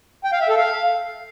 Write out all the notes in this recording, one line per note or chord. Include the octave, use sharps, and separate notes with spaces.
G5
F5
E5
A4
F5